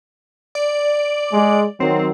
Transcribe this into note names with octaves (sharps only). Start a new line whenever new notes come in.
D5
G#3
D#3 F#3 C4